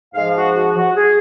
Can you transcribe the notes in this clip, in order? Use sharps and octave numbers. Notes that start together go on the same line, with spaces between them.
G#2 F3 G#3 F5
F#4
F#4
F#4
G#4